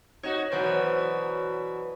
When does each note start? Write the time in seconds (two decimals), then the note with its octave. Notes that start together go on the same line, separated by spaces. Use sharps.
0.23 D#4 F#4 C#5 E7
0.52 B2 E3 F#3 C5 D5 F#5